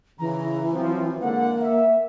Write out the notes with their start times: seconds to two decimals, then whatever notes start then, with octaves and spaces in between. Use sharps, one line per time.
0.19 C#3 E3 A#5
0.73 F3 F#3 C4
1.22 D3 G#3 A#3 F#5
1.62 E5